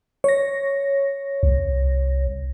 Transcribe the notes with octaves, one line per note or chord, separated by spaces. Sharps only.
C#5 A#6
C2